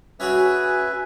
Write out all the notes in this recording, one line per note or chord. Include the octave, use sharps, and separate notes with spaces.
C#4 F#4 G#4 B4 E5 G#5